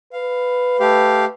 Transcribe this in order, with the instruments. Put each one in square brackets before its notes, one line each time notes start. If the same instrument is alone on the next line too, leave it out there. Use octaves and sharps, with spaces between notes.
[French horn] B4 [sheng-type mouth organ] F5
[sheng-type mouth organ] A3 G4 F5